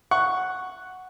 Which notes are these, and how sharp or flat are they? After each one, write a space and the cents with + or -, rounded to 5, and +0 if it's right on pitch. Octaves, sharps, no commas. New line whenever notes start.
F#5 +0 C#6 +0